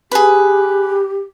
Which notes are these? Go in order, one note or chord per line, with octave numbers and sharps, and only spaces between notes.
G4 G#4 B4